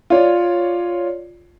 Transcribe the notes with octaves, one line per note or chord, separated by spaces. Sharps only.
F4 C#5 D5